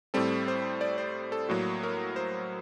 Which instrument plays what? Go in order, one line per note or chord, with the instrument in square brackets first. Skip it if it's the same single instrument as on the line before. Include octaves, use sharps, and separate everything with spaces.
[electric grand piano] A2 G3 C4 A4
C5
D5
C5
A4
A2 F#3 A#3 F#4
A#4
C5